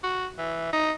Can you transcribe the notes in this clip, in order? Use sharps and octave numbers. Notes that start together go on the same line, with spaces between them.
F#4
E3
D#4